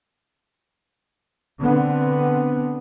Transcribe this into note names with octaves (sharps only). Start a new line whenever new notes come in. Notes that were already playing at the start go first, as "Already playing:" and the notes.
D3 B3 C4